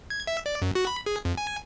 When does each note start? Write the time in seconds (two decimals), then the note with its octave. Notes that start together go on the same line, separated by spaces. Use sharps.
0.10 G#6
0.27 E5
0.46 D5
0.62 F#2
0.75 F#4
0.87 B5
1.06 G#4
1.25 F2
1.37 G#5